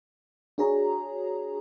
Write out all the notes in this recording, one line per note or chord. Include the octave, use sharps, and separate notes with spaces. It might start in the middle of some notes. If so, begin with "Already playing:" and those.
D4 F#4 G#4 C#5 A#5